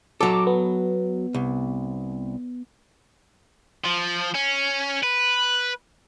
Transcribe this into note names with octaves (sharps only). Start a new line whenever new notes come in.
F#3 A4 D6
B3
C2
F3
C#4
B4